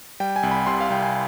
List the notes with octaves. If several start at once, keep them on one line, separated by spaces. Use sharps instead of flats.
G3 G5
G#5
C2
B5
C3 C6
F5
C2 G5
G#5